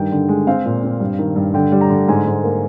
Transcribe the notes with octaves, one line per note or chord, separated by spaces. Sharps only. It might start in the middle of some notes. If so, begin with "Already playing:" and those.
Already playing: G2 D#3 G5
D3
G#3
C4 F5
A#2
C4
G2
D#3
G2
D3 G5
G3
A#5
D3
G#2 G#5
G#2
A#3